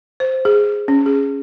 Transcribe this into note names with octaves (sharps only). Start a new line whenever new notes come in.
C5
G#4
C#4
G#4